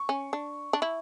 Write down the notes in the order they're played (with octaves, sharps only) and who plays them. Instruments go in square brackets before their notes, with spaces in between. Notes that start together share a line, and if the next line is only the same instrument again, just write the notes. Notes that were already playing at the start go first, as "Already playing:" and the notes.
Already playing: [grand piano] C#6
[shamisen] C#4
D4
D4
E4